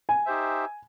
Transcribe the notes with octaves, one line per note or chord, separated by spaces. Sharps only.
G#5
D#4 G4 C5 E5